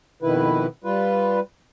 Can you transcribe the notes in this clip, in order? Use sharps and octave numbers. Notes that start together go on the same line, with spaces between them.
F2 B2 D#3 E4 B4
G3 F4 B4